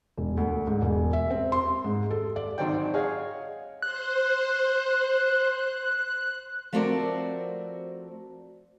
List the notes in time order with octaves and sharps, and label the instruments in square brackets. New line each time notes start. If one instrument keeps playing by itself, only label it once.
[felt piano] E1
D2
G#2
E1
E5
C4
C6
G#2
A4
D5
[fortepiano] G#1 D#3 F#3 C5 D5 G5
G#4 C#5 D#5 F5 F#5
[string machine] C5 [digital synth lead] F#6
[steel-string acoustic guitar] F3 A3 C4 F#4 A#4 D5